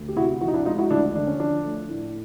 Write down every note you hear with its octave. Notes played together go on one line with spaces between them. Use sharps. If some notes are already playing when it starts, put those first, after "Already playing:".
Already playing: D2
G4
C3 E4 F#4
F3 E4 F#4
D#4
D4 E4
G#3 D#4 F4
E4 F#4
D2 D4 E4
D3 D4
C#4
F3 D4
A3
A2